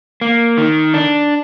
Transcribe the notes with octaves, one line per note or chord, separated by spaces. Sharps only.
A#3
D#3
D4